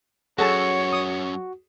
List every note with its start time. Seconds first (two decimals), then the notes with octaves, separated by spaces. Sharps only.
0.39 F#2 F#4 G#4 A4 C#5 A5
0.93 D#6